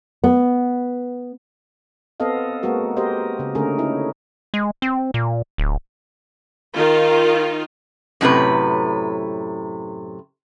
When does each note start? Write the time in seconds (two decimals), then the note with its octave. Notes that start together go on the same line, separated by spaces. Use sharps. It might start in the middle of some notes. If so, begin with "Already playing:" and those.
0.24 B3
2.20 B3 C4 A4 D#5 F5
2.63 G#3 A#3 B3 F#4 A#4
2.97 F#4 G4 A#4 C5 D#5
3.39 C#3
3.55 D3 A3 C#4 G#4 A#4
3.78 C#4 D#4 E4
4.54 G#3
4.82 C4
5.14 A#2
5.58 D1
6.75 D#3 D#4 F4
8.21 F#2 A2 C3 B4